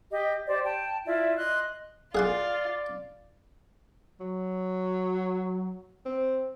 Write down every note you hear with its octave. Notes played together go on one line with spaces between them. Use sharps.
G4 D#5
G4 C5 D5
G5 A5
E4 F4 D5 E5
D#5 C6 F#6
F4 G#4 D5 F5 F#5 C6
F#3
C4